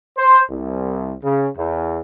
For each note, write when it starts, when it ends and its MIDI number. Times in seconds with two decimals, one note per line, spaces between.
0.17 0.41 72
0.49 1.14 36
1.22 1.47 49
1.56 2.01 40